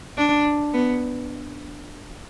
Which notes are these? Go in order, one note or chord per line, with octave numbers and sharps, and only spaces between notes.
D4
B3